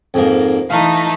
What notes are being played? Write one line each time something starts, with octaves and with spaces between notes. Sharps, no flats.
F2 G#2 A#3
E3 A3 D#4 F5